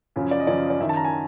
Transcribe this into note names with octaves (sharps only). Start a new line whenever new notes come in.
F#2 C#3 F3
D5
D#5
F#2 C#3 F3 D5
D5
F#2 D#3 E5
A5
A#5
G#5